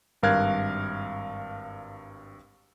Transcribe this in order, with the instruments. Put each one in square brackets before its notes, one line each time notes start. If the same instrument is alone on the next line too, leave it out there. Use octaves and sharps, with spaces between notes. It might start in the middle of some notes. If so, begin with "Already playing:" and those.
[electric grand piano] G#1 G2 A#4 F5 F#6 G#6